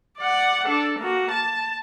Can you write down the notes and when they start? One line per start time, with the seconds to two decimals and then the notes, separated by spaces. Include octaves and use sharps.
0.18 D5 F#5
0.67 D4 A4
0.99 A#3 F#4
1.31 A5